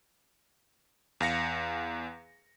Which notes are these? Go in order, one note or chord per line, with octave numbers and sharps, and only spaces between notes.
E2 F5 A#6 C#7